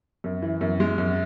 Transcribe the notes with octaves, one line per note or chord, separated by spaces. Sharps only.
F#2
E3
F#2
G#3
F#2